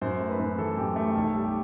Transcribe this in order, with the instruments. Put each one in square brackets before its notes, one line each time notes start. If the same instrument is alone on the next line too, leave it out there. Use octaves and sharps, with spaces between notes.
[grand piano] F#2 C5
A3
B4
F#2
E3 A4
F#2 G4
A3 G4
B1 A4
G3
G4